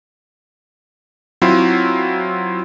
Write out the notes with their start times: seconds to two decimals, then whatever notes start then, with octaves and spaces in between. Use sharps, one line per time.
1.42 F#3 C4 E4 F4